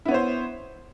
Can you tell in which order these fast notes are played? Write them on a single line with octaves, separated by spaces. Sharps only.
E4 B3 C#5 C5